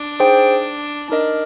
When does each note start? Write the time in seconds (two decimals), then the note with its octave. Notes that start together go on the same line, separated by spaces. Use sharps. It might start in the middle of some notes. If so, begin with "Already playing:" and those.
Already playing: D4
0.20 D#4 G#4 C5 G5
1.10 D4 D#4 A#4 D#5